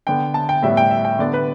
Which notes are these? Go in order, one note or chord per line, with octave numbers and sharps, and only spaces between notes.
D3 B3 D4 G5
A5
G5
A2 G3 B3 E5
G5
E5
G5
D3 B3 D4 D5
B4